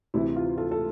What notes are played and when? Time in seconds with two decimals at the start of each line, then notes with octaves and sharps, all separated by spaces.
0.14 D2 C3 E3 E4
0.36 F4
0.58 F4 A4
0.71 A4